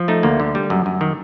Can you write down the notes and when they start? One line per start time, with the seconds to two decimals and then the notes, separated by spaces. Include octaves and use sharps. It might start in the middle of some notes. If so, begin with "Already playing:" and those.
Already playing: F3
0.08 A3 D#4
0.23 D2 A#3
0.40 D3
0.55 G3
0.70 F#2
0.86 F#2
1.01 D#3